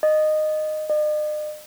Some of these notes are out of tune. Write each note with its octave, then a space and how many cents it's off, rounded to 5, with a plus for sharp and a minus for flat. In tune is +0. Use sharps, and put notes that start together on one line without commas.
D#5 -15
D#5 -45